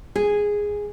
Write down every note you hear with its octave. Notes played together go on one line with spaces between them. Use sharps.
G#4